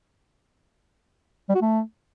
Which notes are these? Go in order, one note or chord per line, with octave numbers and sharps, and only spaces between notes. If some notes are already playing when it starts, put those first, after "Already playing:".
G3
F#4
A3